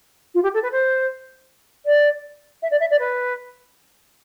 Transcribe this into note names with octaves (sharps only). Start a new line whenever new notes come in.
F4
G4
A4
B4
C5
D5
E5
D5
E5
D5
B4